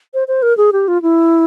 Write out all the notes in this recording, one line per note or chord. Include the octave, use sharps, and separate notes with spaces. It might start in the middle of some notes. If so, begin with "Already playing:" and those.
C5
C5
A#4
G#4
G4
F4
E4